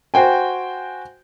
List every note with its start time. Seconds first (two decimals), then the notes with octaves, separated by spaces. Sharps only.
0.14 F#4 C5 G5 G#5